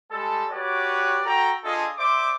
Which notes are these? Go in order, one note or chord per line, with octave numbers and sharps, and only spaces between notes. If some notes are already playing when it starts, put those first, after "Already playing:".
G3 G#3 A4
F#4 G4 B4 C#5 D5
F#4 A4 G5 A#5
D4 F4 G#4 A4 D#5
C5 D5 E5 D6